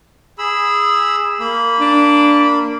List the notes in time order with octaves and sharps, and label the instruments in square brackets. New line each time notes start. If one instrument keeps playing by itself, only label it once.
[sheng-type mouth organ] G#4 B5 E6
A#3 B5
[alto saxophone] D4